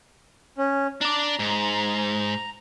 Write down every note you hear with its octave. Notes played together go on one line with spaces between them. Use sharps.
C#4
D4 D5 A#5
G#2